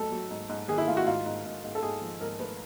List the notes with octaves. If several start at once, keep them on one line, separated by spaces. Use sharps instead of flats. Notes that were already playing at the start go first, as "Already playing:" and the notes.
Already playing: G#2 F#3 A3 A4
F#3
G#2
G#2
D#3 G#4
E4
A3 F4
F#4
G#2 F4
G#2
G#2
G#2
A4
G#2 G#4
F3
G#2 A#4
A3 B4